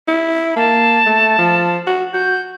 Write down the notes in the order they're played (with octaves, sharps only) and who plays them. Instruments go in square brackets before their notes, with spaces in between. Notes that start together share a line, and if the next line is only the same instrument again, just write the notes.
[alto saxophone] E4
[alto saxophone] A#3 [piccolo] A5
[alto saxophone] A3
F3
F#4
[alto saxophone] F#4 [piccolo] G6